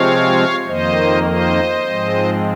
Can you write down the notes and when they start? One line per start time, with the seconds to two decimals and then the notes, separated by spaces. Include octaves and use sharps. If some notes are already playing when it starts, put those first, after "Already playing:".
Already playing: C3 F3 G#3 C4 C#5 F5
0.67 F2 D#3 A#3 C5 D#5
1.25 C5 D#5
1.83 G#2 F3 G#3 C4